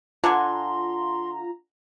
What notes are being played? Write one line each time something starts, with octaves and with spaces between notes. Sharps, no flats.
D3 F4 F#5 G#5 A#5 C6